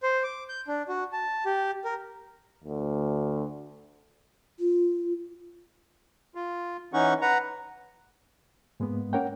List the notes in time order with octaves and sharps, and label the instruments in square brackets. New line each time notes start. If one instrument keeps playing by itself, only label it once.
[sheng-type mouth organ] C5
D6
G6
D4
F#4
A5
G4
A#4
[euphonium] D2
[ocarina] F4
[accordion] F4
E3 C#4 D#4 F#5 C#6
B4 F#5 A#5
[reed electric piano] G#2 G#3 A#3 B3
A#3 C#4 A#4 C#5 F#5 G5